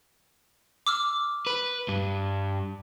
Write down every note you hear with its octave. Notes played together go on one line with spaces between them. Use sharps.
D6 E6 F6
B4
G2